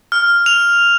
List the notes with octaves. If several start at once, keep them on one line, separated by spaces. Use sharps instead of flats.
F6
F7